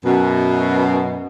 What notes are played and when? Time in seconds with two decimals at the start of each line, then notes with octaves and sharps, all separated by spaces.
0.05 F#2 B2